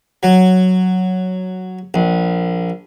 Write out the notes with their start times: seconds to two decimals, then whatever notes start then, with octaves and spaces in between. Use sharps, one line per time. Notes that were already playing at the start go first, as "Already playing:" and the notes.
0.23 F#3
1.94 A#1